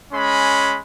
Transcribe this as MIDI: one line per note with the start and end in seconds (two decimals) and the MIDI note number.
0.13 0.78 56
0.13 0.78 61
0.13 0.78 83